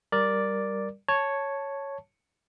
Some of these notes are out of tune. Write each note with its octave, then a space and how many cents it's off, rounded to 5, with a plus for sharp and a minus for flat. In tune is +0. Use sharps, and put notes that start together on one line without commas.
G3 +0 A#4 +5 D5 +0
C#5 +0 A5 +0